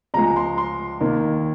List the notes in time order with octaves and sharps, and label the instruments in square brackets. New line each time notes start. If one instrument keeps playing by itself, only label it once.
[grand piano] C#2 C#3 F3 G#3 A#5
C6
C6
D#2 D#3 A#3